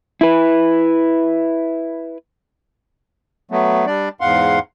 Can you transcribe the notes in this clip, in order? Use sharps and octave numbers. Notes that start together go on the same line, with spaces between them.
E4 B4
F#3 A3 B3
G3 D4 D5
E2 G#2 F5 F#5 C6